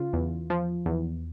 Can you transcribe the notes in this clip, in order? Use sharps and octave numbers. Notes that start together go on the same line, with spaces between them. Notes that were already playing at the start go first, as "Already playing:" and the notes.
Already playing: C#3 F4
E2
F3
E2